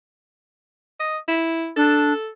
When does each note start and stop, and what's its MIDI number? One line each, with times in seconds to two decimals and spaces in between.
1.00 1.18 75
1.28 1.71 64
1.77 2.13 62
1.77 2.28 69